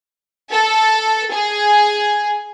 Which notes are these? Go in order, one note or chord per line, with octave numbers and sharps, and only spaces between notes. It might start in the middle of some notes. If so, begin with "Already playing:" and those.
A4
G#4